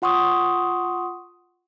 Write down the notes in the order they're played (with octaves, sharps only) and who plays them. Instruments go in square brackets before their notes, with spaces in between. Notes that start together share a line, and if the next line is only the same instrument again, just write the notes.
[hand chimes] F4 F#5 C6 C#6 D#6